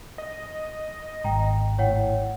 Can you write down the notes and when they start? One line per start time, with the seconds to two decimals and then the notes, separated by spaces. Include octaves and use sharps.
0.18 D#5
1.24 G#1 G5 A#5
1.79 A2 C#5 F#5 G5